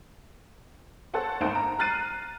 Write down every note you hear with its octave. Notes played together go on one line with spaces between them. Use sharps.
A4 C5 C#5 F#5 A5
G#1 D2 D#4 C5 F#5 D7
A#5
A#5 F6 F#6 A6 C7 D#7